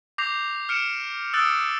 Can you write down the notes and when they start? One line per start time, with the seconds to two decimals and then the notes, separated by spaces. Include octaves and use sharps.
0.18 D6 G6 A#6 C7 F7
0.69 F6 C#7 D7 E7
1.33 D#6 E6 F#6 A6 D7